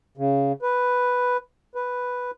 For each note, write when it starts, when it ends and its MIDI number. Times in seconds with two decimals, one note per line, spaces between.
0.17 0.52 49
0.62 1.37 71
1.75 2.31 71